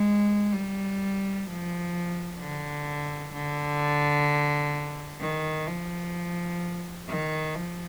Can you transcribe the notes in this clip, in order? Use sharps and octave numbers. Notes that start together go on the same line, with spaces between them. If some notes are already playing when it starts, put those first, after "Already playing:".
Already playing: G#3
G3
F3
D3
D3
D#3
F3
D#3
F3